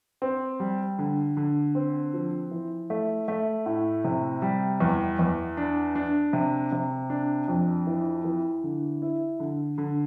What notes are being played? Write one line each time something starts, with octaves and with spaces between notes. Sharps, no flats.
C4
G3
D3
D3
C4
F3
E3
A3
A3
A2
C3
G3
E2
E2
D4
D4
C3
C3
D4
F2
E3
E3
D3
E4
D3
D3